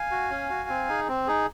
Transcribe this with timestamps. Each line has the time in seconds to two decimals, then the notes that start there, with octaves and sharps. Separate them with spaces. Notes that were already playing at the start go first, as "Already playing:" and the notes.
Already playing: F5 G#5
0.11 F#4
0.30 C#4
0.50 F#4
0.69 C4
0.89 D#4 G#4
1.08 C4
1.27 D#4 G#4